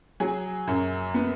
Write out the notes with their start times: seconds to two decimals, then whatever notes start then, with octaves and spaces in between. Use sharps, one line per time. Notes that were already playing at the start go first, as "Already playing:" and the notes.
0.20 F#3 G#4
0.68 F#2
1.14 B3